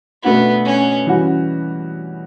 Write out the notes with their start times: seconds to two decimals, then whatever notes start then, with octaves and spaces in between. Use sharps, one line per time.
0.23 B2 A3 B3 D4 F#4
0.66 C#4
1.06 E3 G3 C#4 F#4